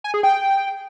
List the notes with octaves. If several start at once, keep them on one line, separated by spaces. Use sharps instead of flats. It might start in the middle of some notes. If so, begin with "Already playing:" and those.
G#5
G#4
G5